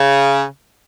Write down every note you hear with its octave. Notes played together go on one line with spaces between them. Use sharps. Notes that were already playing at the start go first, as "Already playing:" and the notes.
Already playing: C#3